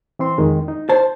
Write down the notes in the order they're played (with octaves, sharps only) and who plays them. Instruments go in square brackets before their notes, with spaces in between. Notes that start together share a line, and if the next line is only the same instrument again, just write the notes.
[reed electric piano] E3 C4 C6
F2 D#3 G#3
D#4
[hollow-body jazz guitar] C5 A5